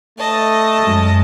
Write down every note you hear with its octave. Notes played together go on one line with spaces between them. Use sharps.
A3 D#5 A5
F#2 G#3